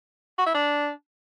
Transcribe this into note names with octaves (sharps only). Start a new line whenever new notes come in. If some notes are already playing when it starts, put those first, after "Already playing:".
F#4
E4
D4